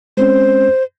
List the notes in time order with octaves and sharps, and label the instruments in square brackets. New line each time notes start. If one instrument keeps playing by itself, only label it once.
[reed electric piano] G#3 C4 C#4 [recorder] C5